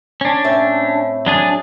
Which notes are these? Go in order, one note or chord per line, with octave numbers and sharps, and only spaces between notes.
C#4 D4
A2 C4 E5
F#3 D4 G#4